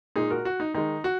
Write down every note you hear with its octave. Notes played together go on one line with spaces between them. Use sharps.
A#2 G#3 D#4 G#4
F#4 A#4
F#4
D#4
D#3 G#3 D#4
F#4